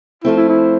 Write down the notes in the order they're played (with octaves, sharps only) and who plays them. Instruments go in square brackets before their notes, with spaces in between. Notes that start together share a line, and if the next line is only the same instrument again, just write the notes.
[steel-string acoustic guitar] F3 A3 C4 [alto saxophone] E4
[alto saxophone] E4
E4